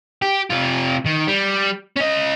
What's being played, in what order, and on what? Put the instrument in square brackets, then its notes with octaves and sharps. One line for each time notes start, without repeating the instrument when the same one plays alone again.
[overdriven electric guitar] G4
C3 F4
D#3
G3
C#4 D#5